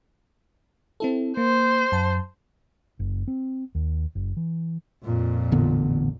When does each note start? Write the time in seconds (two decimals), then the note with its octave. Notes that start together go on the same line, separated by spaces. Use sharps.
1.00 C4 E4 A4
1.37 A#3 C5
1.92 F#2 A5
2.99 F#1
3.28 C4
3.75 D#2
4.15 F#1
4.37 E3
5.04 F2 A#2
5.52 A1 D3 B3